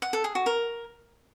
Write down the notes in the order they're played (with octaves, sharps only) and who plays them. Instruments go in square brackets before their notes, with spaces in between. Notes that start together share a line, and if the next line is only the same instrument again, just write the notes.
[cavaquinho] F#5
A4
G#4
F#4
A#4